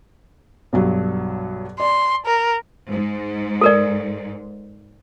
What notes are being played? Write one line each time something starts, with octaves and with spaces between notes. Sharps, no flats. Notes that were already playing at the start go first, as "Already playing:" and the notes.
B1 G2 F#3
D5 C6
A#4
G#2
A4 A#4 D5